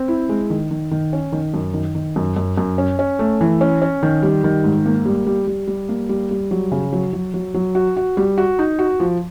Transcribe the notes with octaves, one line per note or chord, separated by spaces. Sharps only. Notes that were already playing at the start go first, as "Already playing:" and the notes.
Already playing: C4
E4
G#3
D#3
D#3
D#3
C#4
D#3
F#2
D#3
D#3
F#2
F#2
F#2
C#4
C#4
A3
E3
C#4
C#4
D#3
G3
D#3
G#2
A#3
G3
G3
G3
G3
A#3
G3
G3
F#3
C#3
F#3
F#3
F#3
F#3
F#4
F#4
G3
F#4
D#4
F#4
F3